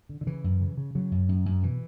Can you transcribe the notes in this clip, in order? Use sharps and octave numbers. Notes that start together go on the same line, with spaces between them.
D3
D3
C#3 E3
F#2
C#3
C#3
C#3 F#3
F#2
F#2
F#2
B2 E3